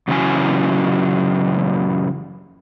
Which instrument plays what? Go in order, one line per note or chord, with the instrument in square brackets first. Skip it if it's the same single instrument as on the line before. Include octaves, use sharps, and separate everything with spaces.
[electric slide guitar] F#2 C#3 E3 F#3 C#4 G#5